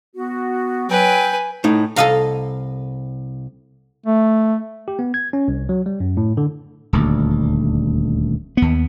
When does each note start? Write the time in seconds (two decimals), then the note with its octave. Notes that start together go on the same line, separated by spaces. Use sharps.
0.16 B3 F#4
0.90 F#3 B4 G5 G#5
1.64 A2 D#4
1.96 C2 A4 D#5 F5 A#5
4.06 A3
4.88 G4
4.99 B3
5.14 G#6
5.33 C#4
5.48 C2
5.69 F#3
5.86 G3
6.00 F#2
6.17 A2
6.37 D3
6.93 D#1 D2
8.57 D#2 B3